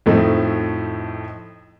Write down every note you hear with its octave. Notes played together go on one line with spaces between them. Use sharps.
F2 A2 F3 A3 D#4